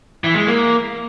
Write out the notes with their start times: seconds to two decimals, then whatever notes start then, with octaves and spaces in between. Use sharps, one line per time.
0.24 E3
0.36 G#3
0.47 A#3